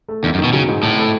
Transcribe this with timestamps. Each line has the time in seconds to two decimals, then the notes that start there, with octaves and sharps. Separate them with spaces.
0.09 A3
0.23 E2 D#3
0.34 F#2
0.38 D#3
0.44 B2
0.53 C#3 F#3
0.68 G#2
0.83 G#1 A2
0.99 A3